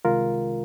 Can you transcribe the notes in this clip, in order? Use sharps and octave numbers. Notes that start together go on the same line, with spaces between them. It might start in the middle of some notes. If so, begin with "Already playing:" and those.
C2 C3 D#3 G#3 F4 A#4